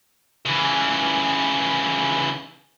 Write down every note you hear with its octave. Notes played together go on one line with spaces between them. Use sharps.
C#3 E3